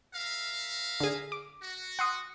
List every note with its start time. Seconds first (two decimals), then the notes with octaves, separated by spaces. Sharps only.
0.13 A#4 E5 F5
1.00 D3 G#4
1.32 D6
1.62 F#4
1.99 F#5 C6 D#6